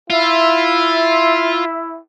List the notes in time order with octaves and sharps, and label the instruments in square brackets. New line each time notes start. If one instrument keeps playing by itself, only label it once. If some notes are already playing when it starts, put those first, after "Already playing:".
[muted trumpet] E4 [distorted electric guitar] F4 [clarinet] E5